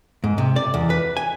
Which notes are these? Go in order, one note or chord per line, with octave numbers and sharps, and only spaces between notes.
G#2
C3
D5
E2
B4
G#5